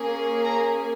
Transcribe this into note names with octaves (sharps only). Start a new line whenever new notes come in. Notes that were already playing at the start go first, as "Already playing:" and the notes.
Already playing: A#3 C#4 G#4
A#5